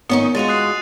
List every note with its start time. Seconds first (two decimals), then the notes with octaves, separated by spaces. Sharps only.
0.09 D#3 B3 C#4 D#4
0.35 G#3 F4 F#4 A6 D#7 F7
0.48 D#6 F#6 C7